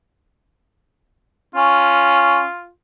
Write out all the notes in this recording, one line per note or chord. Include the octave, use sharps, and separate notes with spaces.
C#4 F4